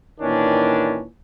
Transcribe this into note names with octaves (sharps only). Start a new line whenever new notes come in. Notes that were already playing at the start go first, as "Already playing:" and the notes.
A#2 D#3 E3 C#4 D4